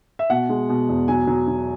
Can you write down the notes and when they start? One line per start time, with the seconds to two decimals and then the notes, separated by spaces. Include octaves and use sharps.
0.19 E5
0.30 B2 F#5
0.49 G#3
0.69 B2
0.89 E2
1.08 F#3 G#5
1.27 F#3
1.48 F#3